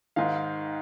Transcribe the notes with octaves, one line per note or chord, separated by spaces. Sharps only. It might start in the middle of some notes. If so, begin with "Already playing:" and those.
G#2 D#3 F5